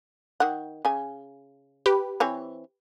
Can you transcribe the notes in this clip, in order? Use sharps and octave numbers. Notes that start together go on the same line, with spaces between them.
D#3 F#5
C#3 G#5
G4 B4
E3 C4 C#5